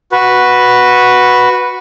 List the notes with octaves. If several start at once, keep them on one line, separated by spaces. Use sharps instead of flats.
F#4 B4